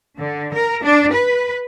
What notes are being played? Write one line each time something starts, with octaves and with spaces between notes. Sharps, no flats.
D3
A#4
D4
B4